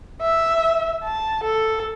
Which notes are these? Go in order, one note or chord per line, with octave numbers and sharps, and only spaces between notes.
E5
A5
A4